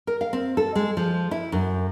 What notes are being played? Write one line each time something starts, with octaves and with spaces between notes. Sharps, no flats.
A#4
F5
C4
A4
G#3
F3
E4
F#2